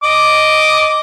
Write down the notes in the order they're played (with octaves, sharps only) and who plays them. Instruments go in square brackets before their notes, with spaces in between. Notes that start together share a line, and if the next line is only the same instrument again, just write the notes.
[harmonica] D#5 D6